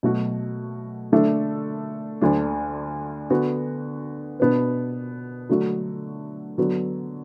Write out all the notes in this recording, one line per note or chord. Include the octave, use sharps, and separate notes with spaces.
B2 F#3 A3 F#4
D3 A3 D4 A4 E5
D2 D3 A3 D4
D3 B3 F#4
B2 B3 D4 B4
D3 F#3 A3 F#4
D3 F#3 B3 F#4